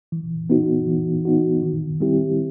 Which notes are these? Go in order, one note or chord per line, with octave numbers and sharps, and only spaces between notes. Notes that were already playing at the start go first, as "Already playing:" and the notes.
E3
B3 D#4 F#4
E3
B3 D#4 F#4
D#3
G3 C4 E4 G4